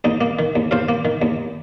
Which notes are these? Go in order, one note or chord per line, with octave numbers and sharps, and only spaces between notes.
D#2 D#4
A#3
D#3
D#2
D#2 C5 F5
A#3
D#3
D#2